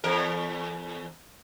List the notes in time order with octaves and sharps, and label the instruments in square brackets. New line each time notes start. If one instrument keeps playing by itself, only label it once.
[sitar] E2 A#4